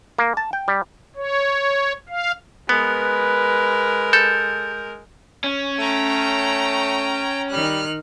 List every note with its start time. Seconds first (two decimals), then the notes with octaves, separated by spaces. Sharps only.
0.19 A#3
0.37 A5
0.53 G5
0.68 G3
1.16 C#5
2.09 F5
2.69 G#3 B3 A#4 B4
4.13 A4 G6
5.44 C#4
5.79 A3 G5 A#5
7.51 D#3 G3 F6 F#6